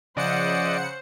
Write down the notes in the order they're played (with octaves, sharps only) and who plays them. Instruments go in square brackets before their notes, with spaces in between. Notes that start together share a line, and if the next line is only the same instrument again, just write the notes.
[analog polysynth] C#3 F#5 C#7 [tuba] F3 [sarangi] C5 [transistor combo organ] D5 D#5